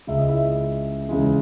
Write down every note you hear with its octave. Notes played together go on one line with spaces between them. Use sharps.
C#2 C#3 G#3 E5
D#5
E4 E5
C#2 C#3 E3 G#3